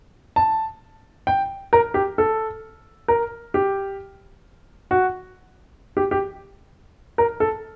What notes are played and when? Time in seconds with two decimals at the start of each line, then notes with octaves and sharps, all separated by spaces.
0.36 A5
1.27 G5
1.73 A#4
1.94 G4
2.18 A4
3.08 A#4
3.54 G4
4.91 F#4
5.97 G4
6.11 G4
7.18 A#4
7.40 A4